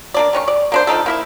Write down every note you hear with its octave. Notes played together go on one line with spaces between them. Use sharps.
A#3 D4 D5
D#3 C#4 F#4 C#6
D5
A#3 D4 C5
F3 D4 D#4 A4
A#3 E4 E5